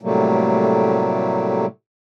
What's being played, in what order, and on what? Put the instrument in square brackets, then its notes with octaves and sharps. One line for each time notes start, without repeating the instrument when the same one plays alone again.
[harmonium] A2 C3 F#3 G3 A3 A#3